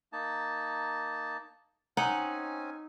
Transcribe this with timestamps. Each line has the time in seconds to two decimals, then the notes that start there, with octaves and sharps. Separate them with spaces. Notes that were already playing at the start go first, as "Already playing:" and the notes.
0.13 A#3 D#4 A5
1.97 C4 C#4 D#4 F#5 G#5